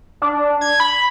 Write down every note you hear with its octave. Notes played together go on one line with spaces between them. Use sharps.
D4
G#6
B5